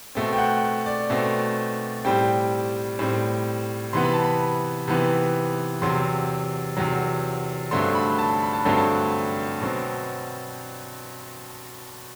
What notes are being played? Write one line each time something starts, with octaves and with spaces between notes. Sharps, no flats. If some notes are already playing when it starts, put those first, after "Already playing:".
B2 A3 C4
G5
F#5
D5
B2 A3 C4
A2 G3 C4 G5
A2 G3 C4
C3 E3 B3 C6
B5
A5
B5
C3 E3 B3
E2 C3 F#3 C6
E2 C3 F#3
G2 D3 F#3 A3 C4 C6
B5
A5
B5
A5
G2 D3 F#3 A3 C4 G5
A5
B2 F#3 C4